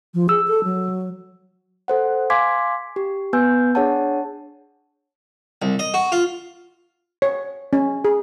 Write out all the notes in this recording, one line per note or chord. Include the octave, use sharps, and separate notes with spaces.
F3
G#4 E6
A4
F#3
A4 C5 F#5
F5 G#5 C6 D6 G#6 B6
G4
B3 B4 G#5 E6 G6
D4 G#4 C#5 F#5 A5
C2
D#5
F#4
F4
C#5
C#4
G#4